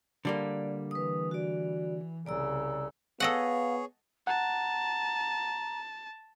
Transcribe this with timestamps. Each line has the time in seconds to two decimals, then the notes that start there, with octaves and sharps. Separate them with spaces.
0.25 D3 G3 A#3 D5
0.91 E3 B4 D#6
1.31 F#4 D5
2.26 C2 C#3 D5 A#5 E6
3.20 B3 G#4 A4 C#5 D#5 F5 F#5
4.27 F#5 A5 A#5